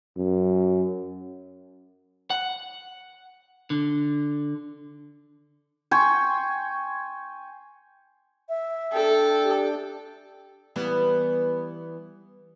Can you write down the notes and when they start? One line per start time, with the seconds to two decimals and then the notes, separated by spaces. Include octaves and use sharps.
0.17 F#2
2.30 F#5
3.70 D3
5.91 G5 G#5 C6 C#6
8.49 E5
8.93 D4 A4 G5
9.44 G4
10.76 E3 G3 B3